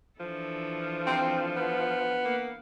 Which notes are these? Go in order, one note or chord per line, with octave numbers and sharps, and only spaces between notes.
E3 F3 D4 A4
C4
B3
A#3